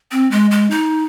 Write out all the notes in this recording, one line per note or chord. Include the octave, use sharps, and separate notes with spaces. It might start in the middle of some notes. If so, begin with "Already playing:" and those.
C4
G#3
G#3
D#4